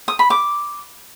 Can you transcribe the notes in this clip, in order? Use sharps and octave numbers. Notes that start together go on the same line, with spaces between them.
D#6
B5
D6